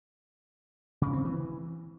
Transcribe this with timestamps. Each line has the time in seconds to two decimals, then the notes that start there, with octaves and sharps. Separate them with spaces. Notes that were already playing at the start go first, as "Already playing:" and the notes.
1.02 C#3
1.13 C4
1.25 E3